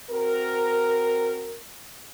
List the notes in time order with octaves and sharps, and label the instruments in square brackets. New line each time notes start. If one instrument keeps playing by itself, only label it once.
[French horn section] C4 F#4 A#4